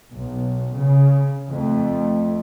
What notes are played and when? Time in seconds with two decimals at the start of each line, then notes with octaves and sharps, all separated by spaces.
0.13 B1
0.77 C#3
1.50 F2 A3